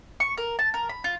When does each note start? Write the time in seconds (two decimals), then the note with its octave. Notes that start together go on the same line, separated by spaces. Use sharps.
0.20 C#6
0.38 A#4
0.59 A5
0.74 A#4
0.89 B5
1.04 F4